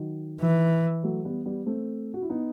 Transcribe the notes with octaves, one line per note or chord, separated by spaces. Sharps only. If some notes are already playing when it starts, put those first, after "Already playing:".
Already playing: D#3 F#3
E3
F#3 A3
G3 B3
G3 B3
A3 C4
F#4
E4
B3 D#4